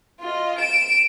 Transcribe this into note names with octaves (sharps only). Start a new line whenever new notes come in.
F4 D#5
D7 E7